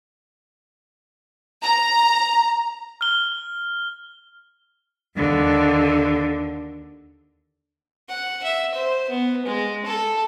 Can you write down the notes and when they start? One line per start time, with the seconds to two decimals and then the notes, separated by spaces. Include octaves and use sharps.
1.63 A#5
3.01 F6 G7
5.16 D#2 D3
8.09 F#5
8.44 E5
8.75 C5
9.10 B3
9.46 G#3
9.86 A4